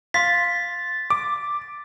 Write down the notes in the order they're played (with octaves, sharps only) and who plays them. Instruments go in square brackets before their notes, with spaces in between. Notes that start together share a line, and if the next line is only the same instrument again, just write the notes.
[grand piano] F5 C6 [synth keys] A6 [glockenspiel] B6
[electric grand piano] D6